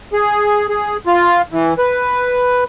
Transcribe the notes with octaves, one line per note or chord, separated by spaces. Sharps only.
G#4
G#4
F4
E3
B4